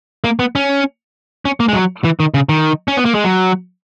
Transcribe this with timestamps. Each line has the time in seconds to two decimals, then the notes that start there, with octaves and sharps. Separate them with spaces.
0.24 A#3
0.39 B3
0.55 C#4
1.45 C#4
1.60 A#3
1.69 G#3
1.74 F#3
2.04 E3
2.20 D#3
2.34 C#3
2.49 D#3
2.88 C#4
2.97 B3
3.05 A#3
3.15 G#3
3.24 F#3